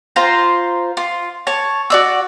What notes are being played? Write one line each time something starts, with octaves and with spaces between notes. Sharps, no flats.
F4 C5 A#5
F4
C#5 A5
F#4 D5 E6